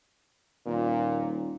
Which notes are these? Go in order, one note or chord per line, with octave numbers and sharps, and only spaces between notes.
D#1 A#2